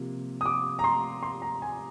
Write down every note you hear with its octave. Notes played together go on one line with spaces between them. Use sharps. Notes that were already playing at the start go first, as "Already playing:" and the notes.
Already playing: C3 F3 A#3
D#6
D6
A#5
C6
C6
A#5
G#5